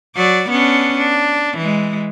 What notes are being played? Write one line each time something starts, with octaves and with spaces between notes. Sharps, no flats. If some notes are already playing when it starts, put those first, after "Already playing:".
F#3 D5
B3 C#4 D4
D4
E3 G#3